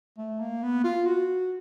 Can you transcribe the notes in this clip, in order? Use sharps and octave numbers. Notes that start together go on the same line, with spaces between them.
A3
A#3
B3
F4
F#4